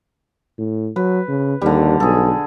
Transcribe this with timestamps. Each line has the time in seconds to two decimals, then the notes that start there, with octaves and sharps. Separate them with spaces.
0.58 A2
0.96 F#3 B4
1.28 C#3
1.61 D#2 D3 G3
2.00 B1 G#4 A4